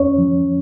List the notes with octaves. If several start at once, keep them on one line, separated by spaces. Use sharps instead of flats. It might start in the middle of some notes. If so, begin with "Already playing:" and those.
Already playing: F2 C#4 C#5
F3